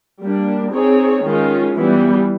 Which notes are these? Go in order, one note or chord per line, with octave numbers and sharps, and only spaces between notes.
G3 A#3 D4
C4 D#4 G#4 C#5
D#3 G#3 C#4 F4
E3 G3 B3